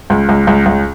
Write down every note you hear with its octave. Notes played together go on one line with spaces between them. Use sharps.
C#2
C#2
C#2
C#2